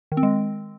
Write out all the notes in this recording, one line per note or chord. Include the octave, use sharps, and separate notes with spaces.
D#3
C4
G#3